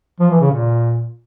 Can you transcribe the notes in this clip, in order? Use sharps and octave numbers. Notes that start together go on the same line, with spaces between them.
F3
E3
C#3
A#2